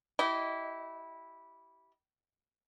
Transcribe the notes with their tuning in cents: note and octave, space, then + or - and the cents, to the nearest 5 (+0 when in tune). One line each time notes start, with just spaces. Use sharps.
E4 -10 G4 -30 D#5 +0